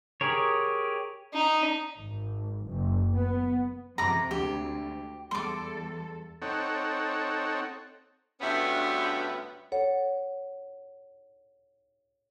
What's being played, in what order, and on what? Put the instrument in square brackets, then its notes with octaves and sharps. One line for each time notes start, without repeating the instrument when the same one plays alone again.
[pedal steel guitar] G4 G#4 A#4 C#5
[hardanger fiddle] D#4
[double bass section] G#1
F#1
B3
[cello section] F2 C3 [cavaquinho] A#5 D6
[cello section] D2 [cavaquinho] G4
[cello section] E2 G3 A4 [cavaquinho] C6 D6
[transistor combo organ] C4 D#4 A4 C#5 F#5
[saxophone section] D2 G2 B3 C#4 E5
[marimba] A4 C#5 F#5